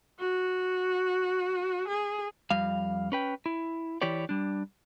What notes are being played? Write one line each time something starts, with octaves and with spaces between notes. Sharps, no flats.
F#4
G#4
F2 G3 F5
C#4 B4 G5
E4
E3 E4 G4 C#5 D5
G3 D4